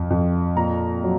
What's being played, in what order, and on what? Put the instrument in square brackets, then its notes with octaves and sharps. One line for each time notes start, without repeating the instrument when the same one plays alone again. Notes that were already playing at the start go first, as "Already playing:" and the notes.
Already playing: [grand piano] F2
F2
A#2 A#5
F#3